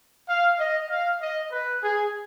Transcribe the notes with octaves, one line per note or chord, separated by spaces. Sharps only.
F5
D#5
F5
D#5
B4
G#4